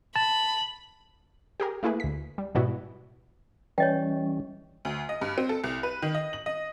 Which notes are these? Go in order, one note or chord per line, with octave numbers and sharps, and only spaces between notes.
A5 B5
G4 G#4 A#4
A3 A#3 E4 G#4 B4
D2 B6
G3
G#2 B2 G3 B3 E4 F#4
E3 G3 C#4 C#5 D#5 G5
D2
D#5
G2
C4
A4
C2
B4
D#3
D#5
F#7
D#5